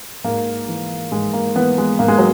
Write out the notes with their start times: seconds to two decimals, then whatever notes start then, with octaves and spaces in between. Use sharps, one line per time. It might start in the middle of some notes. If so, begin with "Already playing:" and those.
0.24 G#2 A#3
0.68 E3
1.12 G#2 G#3
1.33 A#3
1.55 E3 B3
1.78 G#3
1.99 G#2 A#3
2.08 G#3
2.18 F#3